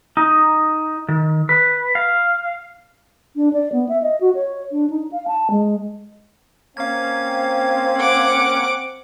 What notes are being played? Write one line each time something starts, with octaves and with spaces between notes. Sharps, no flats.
D#4
D#3
B4
F5
D4
D5
B3
E5
D#5
F#4
C#5
D4
D#4
F5
A5
G#3
A#3 C4 C#4 F5 G#6
F#5 D6